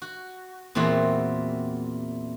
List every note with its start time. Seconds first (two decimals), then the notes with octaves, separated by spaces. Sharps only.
0.02 F#4
0.75 E2 A#2 C4 E4 F#4